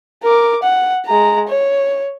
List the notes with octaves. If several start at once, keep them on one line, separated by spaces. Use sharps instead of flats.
A#4 D6
F#5
G#3 A#5
C#5